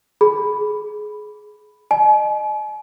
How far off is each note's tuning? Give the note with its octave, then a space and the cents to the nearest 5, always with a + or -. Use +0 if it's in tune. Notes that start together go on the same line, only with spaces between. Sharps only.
G#4 +25 B5 +0
D#5 -30 G#5 +45